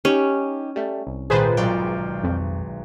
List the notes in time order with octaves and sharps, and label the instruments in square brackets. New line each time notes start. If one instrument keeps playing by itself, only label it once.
[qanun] C#4 [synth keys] D#4 G4
[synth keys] G3 A3
C2
[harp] G#1 A#2 A6 [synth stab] G#4 B4 C5
[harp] B1 [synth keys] D5 F5 G5
[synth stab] F2